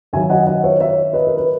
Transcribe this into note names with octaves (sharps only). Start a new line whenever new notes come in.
F#2 D#3 F#3 E5 G#5
D#5 F#5
D#5 F#5
C#5 E5
C#5 E5
B4 D#5
A#4
B4